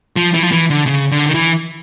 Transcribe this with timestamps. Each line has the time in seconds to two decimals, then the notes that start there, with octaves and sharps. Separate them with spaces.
0.16 F3
0.34 E3
0.43 F3
0.52 E3
0.70 D3
0.87 C#3
1.11 D3
1.26 D#3
1.34 E3